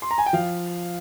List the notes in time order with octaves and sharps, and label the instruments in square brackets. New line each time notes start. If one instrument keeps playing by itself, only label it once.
[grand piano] C6
A#5
G#5
G5
F3 F5